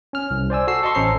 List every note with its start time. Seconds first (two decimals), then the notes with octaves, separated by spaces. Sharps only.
0.13 C#4 F6
0.31 C2
0.50 C5 D5 G#5 E6
0.67 F#4 A4 E6 C7
0.83 A4 D#5 C6 C#6
0.95 A1 C#4 A4 C5 A#5 C7